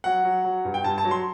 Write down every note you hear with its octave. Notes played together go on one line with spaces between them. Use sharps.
F#3 F#5
F#3
F#3
G2
G5
G2 A5
A5
F#3
C6